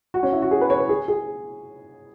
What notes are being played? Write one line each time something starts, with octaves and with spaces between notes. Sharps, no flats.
F#4
C#4
E4
F#4
G#4
B4
C#5
B4
G#4
G#4